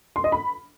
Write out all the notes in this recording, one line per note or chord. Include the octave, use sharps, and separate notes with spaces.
C6
D#5
B5